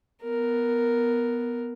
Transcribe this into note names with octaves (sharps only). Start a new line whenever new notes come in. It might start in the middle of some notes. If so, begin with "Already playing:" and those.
B3 A#4